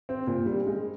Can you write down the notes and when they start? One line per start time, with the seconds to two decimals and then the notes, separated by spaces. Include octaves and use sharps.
0.09 C4
0.27 A#2
0.46 G3
0.67 G#3